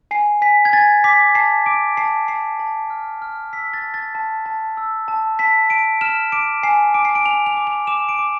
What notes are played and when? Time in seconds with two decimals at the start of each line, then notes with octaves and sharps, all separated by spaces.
0.11 G#5 C7
0.42 G#5 B6
0.65 G#6
0.73 G#5 A6
1.04 D6 B6
1.35 A5 C7
1.66 D6 D7
1.97 A5 C7
2.28 A5 C7
2.59 A5
2.90 F6
3.22 F6
3.53 E6 B6
3.74 A6
3.84 A5
3.94 A6
4.15 A5
4.46 A5
4.77 E6
5.08 A5
5.39 A5 B6
5.70 A5 D7
6.01 F6 E7
6.32 D6 D7
6.63 G#5 C7
6.94 D6 D7
7.05 C7
7.15 D7
7.25 G#5 F7
7.46 F7
7.57 D6
7.67 F7
7.87 D6 E7
8.09 D7
8.19 D6